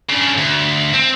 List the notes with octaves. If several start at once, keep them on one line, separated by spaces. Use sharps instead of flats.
C#3 D4
D2
C4